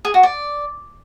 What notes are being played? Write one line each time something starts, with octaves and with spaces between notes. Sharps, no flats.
G#4
F#4
D5